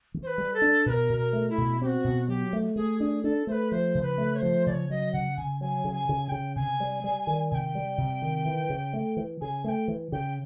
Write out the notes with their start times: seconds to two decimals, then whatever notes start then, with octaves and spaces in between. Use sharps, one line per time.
0.14 E3
0.23 C5
0.27 B4
0.38 G3
0.54 A4
0.62 D4
0.86 B2 A#4 B4
1.10 B2
1.17 A#4
1.33 A3
1.49 E4
1.58 B2
1.81 C4 F#4 G4
2.04 B2
2.28 F#3 G4
2.53 A3
2.76 A3 G#4
3.00 D4 G#4
3.23 D4 A4
3.47 A3 C5
3.52 B4
3.71 F3 C5
3.95 C#3
4.03 B4
4.18 A3
4.35 C#5
4.38 F3 C5
4.66 C#3 C#5 D5
4.90 F#3 D#5
5.13 C#3 F#5
5.37 C#3 G#5
5.61 F#3 G#5
5.84 C#3
5.93 G#5
6.09 C#3
6.24 G#5
6.29 C#3 G5
6.56 C3 G#5
6.80 G3
7.04 G3
7.27 D#3
7.51 C3 G5 G#5
7.75 G3
7.98 C3
8.22 D#3
8.45 E3
8.70 C#3
8.93 A3
9.17 E3
9.41 C#3 G#5
9.64 A3 G#5
9.68 G5
9.88 E3
10.12 C#3 G5